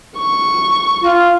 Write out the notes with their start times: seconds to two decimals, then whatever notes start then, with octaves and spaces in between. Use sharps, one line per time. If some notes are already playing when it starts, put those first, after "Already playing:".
0.19 C#6
1.02 F4